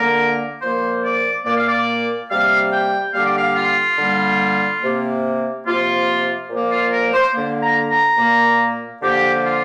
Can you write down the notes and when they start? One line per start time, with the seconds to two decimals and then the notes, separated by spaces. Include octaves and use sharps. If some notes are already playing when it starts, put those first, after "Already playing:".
Already playing: D3 A#3 A#4
0.61 A#2 F3 A#3 C5
1.03 D5
1.45 A#2 A#3 D5
1.56 F5
1.67 D5
2.29 C3 G3 A#3 F5
2.72 G5
3.13 D3 G3 A#3 F5
3.25 D5
3.38 F5
3.55 F4
3.97 D3 G3 A#3
4.81 C3 A#3
5.65 C3 F3 A#3 F4
6.49 A#2 F3 A#3
6.70 F4
6.92 A#4
7.12 C5
7.34 D3 A#3
7.61 A#5
7.89 A#5
8.18 A#2 A#3
9.01 D3 F3 A#3 G4
9.44 F4